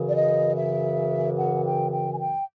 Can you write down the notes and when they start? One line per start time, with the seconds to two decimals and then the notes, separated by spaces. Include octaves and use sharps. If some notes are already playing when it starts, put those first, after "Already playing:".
Already playing: F#2 C#3 E3
0.09 D5
0.18 D#5
0.57 E5
1.39 F#5
1.67 G5
1.93 G5
2.13 G#5
2.20 G5